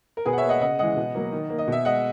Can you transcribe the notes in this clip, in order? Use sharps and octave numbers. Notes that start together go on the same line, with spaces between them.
A#4
B2 G#4 B4
F#5
C#5 E5
A#3
D#5 F#5
C#3 D#5 F#5
E3 G#3 D#5 F#5
B2
F#3 A#3
D#3
A#3
D#5
B2 E5
G#3 D#5 F#5